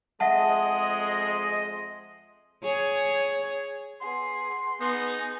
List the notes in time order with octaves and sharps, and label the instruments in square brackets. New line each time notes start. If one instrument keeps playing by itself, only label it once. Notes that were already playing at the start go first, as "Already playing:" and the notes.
[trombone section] F2 G#3 [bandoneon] D#5 [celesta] E5 F#5 A5
[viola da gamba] G#4 C#5
[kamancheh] B3 G#4 [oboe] C6
[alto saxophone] B3 [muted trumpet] D#4 [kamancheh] G#4